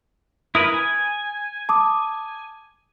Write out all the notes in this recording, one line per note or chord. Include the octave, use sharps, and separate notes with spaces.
E4 A#4 B4 D#6
G#5
A5 D6 D#6